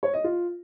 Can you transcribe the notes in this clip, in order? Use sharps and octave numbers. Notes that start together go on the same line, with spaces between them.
C#5
D#5
F4